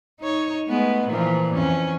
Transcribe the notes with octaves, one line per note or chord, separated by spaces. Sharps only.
D#4 C#5
G#3 A3 B3
A#2 E3 F3
F2 C#4